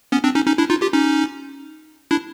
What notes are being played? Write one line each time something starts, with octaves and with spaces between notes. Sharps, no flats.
B3 C#4
C4 D4
C#4 D#4
C#4 D#4
D4 E4
D#4 F4
F4 G4
C#4 D#4
D4 E4